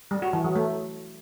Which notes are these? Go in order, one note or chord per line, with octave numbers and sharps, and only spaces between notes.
G3
F#4
E3
F#3
A3